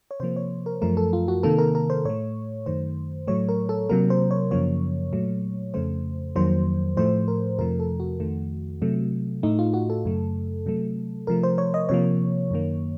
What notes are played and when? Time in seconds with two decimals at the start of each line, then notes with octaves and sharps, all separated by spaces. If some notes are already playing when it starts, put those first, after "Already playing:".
0.11 C#5
0.20 C3 F3 A#3 C5
0.36 C#5
0.66 A#4
0.82 F#2 F3 A3 A#4
0.97 A4
1.13 F4
1.28 F#4
1.43 C3 D#3 A#3 A4
1.58 A#4
1.75 A#4
1.90 C5
2.05 A2 A3 C#5
2.66 F#2 D#3 A3 C5
3.27 A2 F#3 A3 C#5
3.49 A#4
3.69 A4
3.89 C3 F#3 A#3 A#4
4.10 C5
4.31 C#5
4.51 F#2 C#3 F3 A#3 C#5
5.12 A#2 F#3 A3
5.74 F2 C#3 A3 C5
6.36 F2 D#3 F#3 A#3 C5
6.97 A2 F3 A3 C5
7.28 A#4
7.59 F2 C3 F3 A3 A#4
7.80 A4
8.00 F#4
8.20 F2 D#3 A3
8.82 C3 F#3 A3
9.43 A2 A3 D#4
9.59 F4
9.74 F#4
9.90 A4
10.05 F#2 C#3 A3
10.66 C3 F#3 A3
11.27 C3 F3 A3 A#4
11.43 C5
11.58 C#5
11.74 D#5
11.89 C3 F3 A#3 C#5
12.51 F#2 D#3 A#3